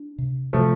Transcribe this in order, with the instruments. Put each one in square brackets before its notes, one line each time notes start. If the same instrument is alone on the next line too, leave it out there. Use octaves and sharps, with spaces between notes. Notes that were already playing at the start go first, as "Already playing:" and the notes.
Already playing: [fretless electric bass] D4
C3
[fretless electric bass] C3 [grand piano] F3 A3